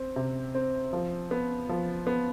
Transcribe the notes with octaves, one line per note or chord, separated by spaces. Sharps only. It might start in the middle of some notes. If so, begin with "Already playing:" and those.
Already playing: C4
C3
C4
F3
B3
F3
B3